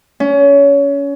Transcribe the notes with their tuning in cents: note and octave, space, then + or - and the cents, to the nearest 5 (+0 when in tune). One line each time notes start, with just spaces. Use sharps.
C#4 +25